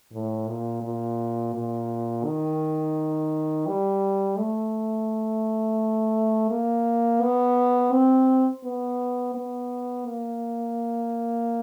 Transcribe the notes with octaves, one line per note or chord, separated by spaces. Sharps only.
A2
A#2
A#2
A#2
D#3
G3
A3
A#3
B3
C4
B3
B3
A#3